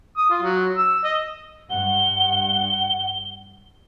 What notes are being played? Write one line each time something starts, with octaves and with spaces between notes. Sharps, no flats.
D#6
F4
F#3
E6
D#5
G2 F#5 G7